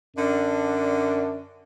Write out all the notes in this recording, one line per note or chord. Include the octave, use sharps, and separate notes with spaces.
F#2 D3 D4